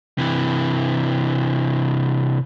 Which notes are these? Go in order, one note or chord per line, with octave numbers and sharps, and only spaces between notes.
C3 E3